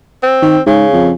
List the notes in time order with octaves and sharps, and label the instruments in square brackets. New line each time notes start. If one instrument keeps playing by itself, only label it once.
[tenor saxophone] C4
[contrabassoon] D#3
[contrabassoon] G#2 [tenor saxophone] C#3
[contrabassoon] F2